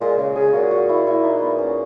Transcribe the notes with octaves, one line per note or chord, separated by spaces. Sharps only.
A#2 G#3
C#3
C#3 G#4
A#2 F#4
F#4
E4
E4
D#4
B3
C#4